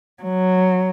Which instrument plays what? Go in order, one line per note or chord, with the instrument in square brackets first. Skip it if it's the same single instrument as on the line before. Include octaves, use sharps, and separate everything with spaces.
[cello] F#3